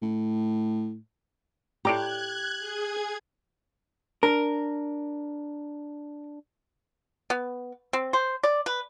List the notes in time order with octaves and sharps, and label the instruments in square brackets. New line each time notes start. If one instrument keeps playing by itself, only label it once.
[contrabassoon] A2
[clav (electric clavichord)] A2 D5 A#5 [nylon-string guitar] G4 [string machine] F#6 G#6
[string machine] G#4 G#6
[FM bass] D4 [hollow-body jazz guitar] A#4
[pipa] B3
C4
C5
D5
B4